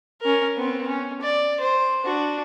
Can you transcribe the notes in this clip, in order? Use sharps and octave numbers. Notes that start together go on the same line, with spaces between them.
C#4 A#4
B3 C4
C#4
D5
C5
D4 F#4